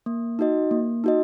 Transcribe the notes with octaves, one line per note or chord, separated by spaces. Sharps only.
A#3
D#4 F#4 D#5
A#3
D#4 F#4 D#5